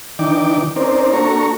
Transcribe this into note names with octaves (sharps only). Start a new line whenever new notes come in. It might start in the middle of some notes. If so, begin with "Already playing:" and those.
D#3 E3 D4 D#4 G5 D6
C4 C#4 D#4 A#4 C5 D5
A#3 D4 F#4 A4 A#5 C#6